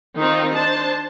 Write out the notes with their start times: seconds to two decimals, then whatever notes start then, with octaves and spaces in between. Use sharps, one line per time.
0.17 D#3 C4 D#4 F4
0.54 D4 C5 A5